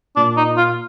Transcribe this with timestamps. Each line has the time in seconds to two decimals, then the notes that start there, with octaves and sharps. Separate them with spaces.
0.16 A#2 D4
0.37 D#4
0.57 F4